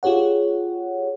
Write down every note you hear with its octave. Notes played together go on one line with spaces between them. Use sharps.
F4 G4 G#4 C#5 F#5